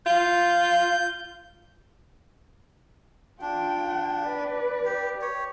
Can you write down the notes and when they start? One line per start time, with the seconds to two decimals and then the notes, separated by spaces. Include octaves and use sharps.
0.06 F4 G6
3.42 D4 F4 G5
4.26 B4 D5
4.85 G4
5.22 G4 C#5